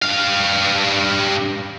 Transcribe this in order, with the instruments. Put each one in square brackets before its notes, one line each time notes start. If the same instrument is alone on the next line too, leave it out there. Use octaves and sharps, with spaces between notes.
[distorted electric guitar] G2 F5